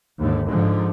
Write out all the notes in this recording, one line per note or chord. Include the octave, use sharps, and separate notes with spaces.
D#2 G#2 D3
G#2 D3 F3